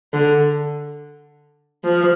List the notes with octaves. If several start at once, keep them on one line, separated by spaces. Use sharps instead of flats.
D3
F3